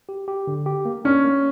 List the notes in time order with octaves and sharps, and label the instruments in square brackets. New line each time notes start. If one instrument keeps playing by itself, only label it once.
[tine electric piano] G4
G4
D3
G4
A#3
[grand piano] C#4 [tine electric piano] D4
[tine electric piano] A#3